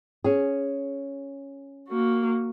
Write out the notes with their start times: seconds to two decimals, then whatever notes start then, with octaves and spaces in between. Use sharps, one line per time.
0.24 C#4 G#4
1.88 A#3 F#4